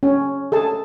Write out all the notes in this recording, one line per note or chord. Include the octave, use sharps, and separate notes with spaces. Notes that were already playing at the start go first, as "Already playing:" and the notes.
C#4
G#4 A4 A5